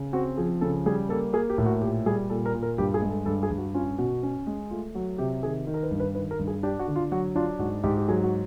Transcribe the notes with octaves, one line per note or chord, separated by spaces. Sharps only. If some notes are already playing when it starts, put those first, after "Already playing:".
Already playing: C#3
C4 F#4
F3 G#4
C#3 A4
G3 G#4
A#3 A4
A#3 G#4
G4
A2
F#4
A#2 G4
G3 G#4
A#2 A4
A#4
A#2
A#4
G2 G4
G#4
G#3
A4
G2 A4
G#4
G2
F#4
C#4 F4
B2 F#4
C#4
G#3
A3 F4
F#3 F#4
C3 G4
D#3 G#4
D#3
A#4
B4
G2
B4
D#3 B4
A#4
G2
G#4
D4 G4
F#4
D3
F4
F#3 F#4
D4 F4
G#2 F#4
G#2 G4
G4
F#3 G#4
F#4